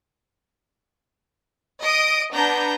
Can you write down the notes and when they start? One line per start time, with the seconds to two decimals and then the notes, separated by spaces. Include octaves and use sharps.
1.82 D#5 D#6 D7
2.32 B3 D4 A#5 G6